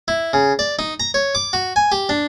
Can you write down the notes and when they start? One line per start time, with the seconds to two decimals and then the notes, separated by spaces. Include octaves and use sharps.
0.08 E4
0.33 C#3
0.59 D5
0.79 D#4
1.00 A#5
1.14 C#5
1.35 D6
1.53 F#4
1.76 G#5
1.92 G4
2.09 D4